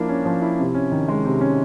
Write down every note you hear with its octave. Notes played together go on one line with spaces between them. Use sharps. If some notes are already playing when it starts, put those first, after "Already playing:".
Already playing: F3 A#3 D4 E4
C#4
F3
E4
C3
C#4
D#3
G#3
C3
C#4